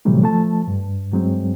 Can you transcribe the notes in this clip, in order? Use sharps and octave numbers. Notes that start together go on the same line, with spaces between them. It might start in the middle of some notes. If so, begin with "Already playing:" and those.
A2 C3 E3 F#3 G3 A3
F3 A3 A5
G2
G2 F#3 G#3 C4